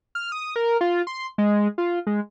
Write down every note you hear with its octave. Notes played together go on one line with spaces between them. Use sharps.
F6
D#6
A#4
F4
C6
G#3
F4
G#3